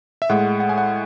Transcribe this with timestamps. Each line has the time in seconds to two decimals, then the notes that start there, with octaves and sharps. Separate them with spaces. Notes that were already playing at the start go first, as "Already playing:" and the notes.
0.22 E5
0.29 A2 G#3 F#5
0.60 F#5
0.69 G#5
0.78 F#5